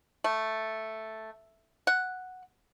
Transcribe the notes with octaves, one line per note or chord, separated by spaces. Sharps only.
A3
F#5